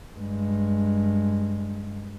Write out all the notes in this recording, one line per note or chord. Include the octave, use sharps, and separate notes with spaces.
G2 G#3